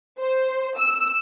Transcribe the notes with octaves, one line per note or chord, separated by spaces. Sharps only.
C5
E6